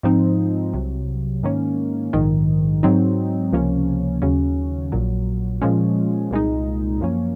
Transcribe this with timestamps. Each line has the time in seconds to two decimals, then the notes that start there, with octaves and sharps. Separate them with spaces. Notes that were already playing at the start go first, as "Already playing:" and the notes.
0.03 G#2 F3 C4 D#4
0.73 C2 C3 F#3
1.43 G#2 D#3 A#3 C#4
2.13 A#1 G#2 D#3
2.83 G#2 F#3 C4 D#4
3.52 C#2 C3 F3 A#3 C#4
4.22 D#2 C#3 F#3 C#4
4.92 A#1 A#2 F#3
5.61 A#2 F3 G#3 C#4
6.31 C2 A#2 G#3 D#4
7.01 F#2 F3 A#3 C#4